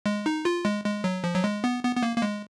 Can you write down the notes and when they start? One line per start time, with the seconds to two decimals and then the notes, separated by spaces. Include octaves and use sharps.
0.06 G#3
0.26 D#4
0.45 F4
0.65 G#3
0.84 G#3
1.04 F#3
1.24 F3
1.35 F#3
1.44 G#3
1.64 B3
1.84 B3
1.96 B3
2.03 A#3
2.17 A#3
2.22 G#3